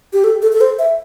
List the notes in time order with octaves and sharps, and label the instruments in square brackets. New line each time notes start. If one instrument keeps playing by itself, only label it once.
[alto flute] G4
A4
A4
A4
C5
E5